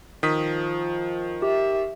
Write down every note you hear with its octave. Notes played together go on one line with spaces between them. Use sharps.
D#3 F3 D#6 B6
G4 E5